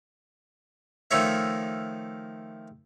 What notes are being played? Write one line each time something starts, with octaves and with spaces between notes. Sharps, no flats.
D#3 F3 A3 D#4 C#5 E5